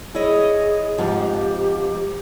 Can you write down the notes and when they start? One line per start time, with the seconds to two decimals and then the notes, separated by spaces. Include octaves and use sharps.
0.15 E4 G#4 C#5 D#5
0.98 F2 G#2 F3 G4